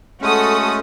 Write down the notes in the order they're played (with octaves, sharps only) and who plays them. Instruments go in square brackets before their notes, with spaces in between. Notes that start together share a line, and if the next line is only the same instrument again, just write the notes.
[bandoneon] G#3 A3 C#4 [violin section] F#4 A4 D#6